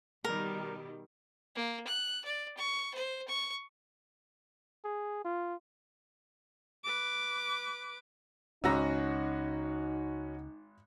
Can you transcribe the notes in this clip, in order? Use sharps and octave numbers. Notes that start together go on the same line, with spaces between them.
B2 D#3 G3 A#4
A#3
F#6
D5
C#6
C5
C#6
G#4
F4
B4 D6
G#1 C#2 C#4 D#4 F#4 A#5 E6 A#6